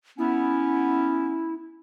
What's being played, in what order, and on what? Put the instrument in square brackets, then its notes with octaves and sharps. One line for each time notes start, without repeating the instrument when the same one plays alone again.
[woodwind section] B3 C#4 [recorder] E4